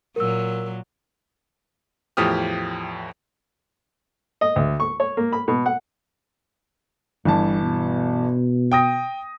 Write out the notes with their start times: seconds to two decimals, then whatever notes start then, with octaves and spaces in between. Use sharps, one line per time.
0.16 A#2 F#3 A#4 E6
2.17 E2 A2 F3 G4 D#6 F6
4.41 D#5
4.56 D2
4.80 C#6
5.00 C#5
5.17 A#3
5.33 B5
5.48 B2
5.66 F#5
7.25 G1 G2 E3 A5
7.62 B2
8.72 G5 D#6 A#6